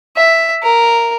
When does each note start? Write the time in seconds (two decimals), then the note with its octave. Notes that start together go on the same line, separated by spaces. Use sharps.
0.17 E5
0.63 A#4